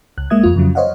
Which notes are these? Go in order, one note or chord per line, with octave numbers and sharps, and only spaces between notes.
C#2 F#6
G#3 A#3 E5 D#6 G#6
F2 F4
F2 C#3 F#3
C5 C#5 D#5 F5 F#5